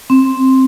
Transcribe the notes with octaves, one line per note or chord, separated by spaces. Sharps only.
C4